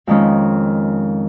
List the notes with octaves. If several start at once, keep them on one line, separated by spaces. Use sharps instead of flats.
F2 D#3 G#3 C#4 F4